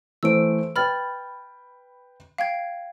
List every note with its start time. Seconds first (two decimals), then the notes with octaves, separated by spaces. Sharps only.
0.23 E3 A3 C5 E6 D7
0.76 B4 G5 B5 F6 A6
2.38 F5 G5 G#6